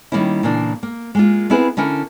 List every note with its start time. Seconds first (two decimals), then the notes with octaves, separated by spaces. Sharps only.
0.12 D#3 G3 A#3 C#4 E4
0.43 A#2 C#3 E3 A#3 D4
0.83 A#3
1.15 G#3 A#3 F4
1.50 B3 C4 E4 G#4 A#4 B4
1.77 D3 C#4 E4 A#4